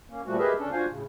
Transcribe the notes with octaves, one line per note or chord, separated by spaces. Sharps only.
A#3 C#4
A#2 F3 G3 A3 F#4
G4 G#4 A#4 B4 D#5 E5
D2 C#4 D4 A4
D4 F4 F#4 C5 F5 G#5
A2 C#3